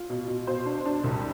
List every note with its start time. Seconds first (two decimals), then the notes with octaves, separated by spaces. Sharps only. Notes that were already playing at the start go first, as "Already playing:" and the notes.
Already playing: F4
0.10 B2
0.28 B2
0.47 B2 C5
0.66 D4
0.86 D4
1.04 C2